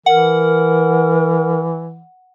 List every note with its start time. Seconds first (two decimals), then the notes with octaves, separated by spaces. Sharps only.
0.06 E3 A#4 F#5